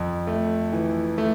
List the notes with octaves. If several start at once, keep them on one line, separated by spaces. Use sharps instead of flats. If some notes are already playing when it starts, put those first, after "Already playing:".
Already playing: F2
A3
E3
A3